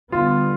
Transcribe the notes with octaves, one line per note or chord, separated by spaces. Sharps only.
D3 G3 B3 F4